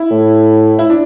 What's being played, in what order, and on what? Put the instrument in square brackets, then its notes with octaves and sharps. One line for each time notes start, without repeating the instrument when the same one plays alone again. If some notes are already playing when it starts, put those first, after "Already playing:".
Already playing: [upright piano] E4
[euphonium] A2
[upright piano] E4
D4